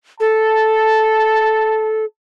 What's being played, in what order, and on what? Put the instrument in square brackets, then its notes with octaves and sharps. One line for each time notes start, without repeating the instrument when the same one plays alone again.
[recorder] A4 [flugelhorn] A5